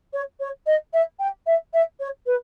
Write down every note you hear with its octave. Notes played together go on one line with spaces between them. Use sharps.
C#5
C#5
D#5
E5
G5
E5
E5
C#5
B4